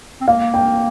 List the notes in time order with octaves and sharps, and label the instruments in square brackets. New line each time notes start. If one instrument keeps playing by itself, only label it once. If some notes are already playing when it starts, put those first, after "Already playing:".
[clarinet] C4
[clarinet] A#3 [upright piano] F5
[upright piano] G5